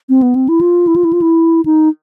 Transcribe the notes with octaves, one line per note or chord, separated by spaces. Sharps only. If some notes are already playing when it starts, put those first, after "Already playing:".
C4
B3
C4
E4
F4
E4
F4
E4
F4
E4
D#4